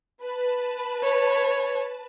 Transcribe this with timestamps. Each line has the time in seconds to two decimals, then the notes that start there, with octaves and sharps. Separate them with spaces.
0.22 B4 A5
1.03 C#5